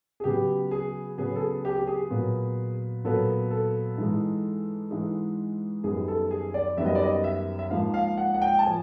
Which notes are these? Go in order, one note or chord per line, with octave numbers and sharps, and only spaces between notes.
G#4
C#3 F#3 B3 G4
G#4
C#3 F#3 B3 G#4
A4
G#4
G4
G4
G#4
A#2 F#3 B3
A#2 F#3 B3 A4
A4
G#2 E3 G#3
G#2 E3 G#3
F#2 D#3 G3 B3 G#4
A4
G#4
D5
F#2 D#3 G3 B3 E5
D#5
D5
D#5
E5
E5
G#2 F3 A#3 F5
F5
F#5
F#5
G5
A5
F3 G#5